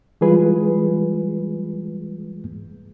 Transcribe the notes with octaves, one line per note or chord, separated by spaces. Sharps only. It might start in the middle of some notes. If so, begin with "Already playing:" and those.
E3 G3 G#3 F4 G#4 B4